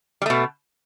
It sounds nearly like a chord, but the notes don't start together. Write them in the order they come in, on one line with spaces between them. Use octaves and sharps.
G3 A3 B2